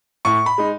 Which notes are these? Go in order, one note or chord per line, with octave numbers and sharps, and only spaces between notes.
A2 C#6
B5
G#3 D#4